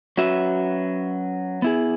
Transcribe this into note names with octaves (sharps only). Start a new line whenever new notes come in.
F#3 C#4 F#4 B4 E5
B3 E4 G#4